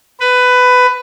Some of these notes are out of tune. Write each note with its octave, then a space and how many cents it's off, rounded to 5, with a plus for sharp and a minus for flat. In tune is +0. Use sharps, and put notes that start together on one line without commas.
B4 +15